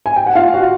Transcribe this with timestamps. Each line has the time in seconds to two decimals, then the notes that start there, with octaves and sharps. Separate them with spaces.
0.06 G#5
0.16 G5
0.26 F#5
0.35 F4 F5
0.54 F#4 F#5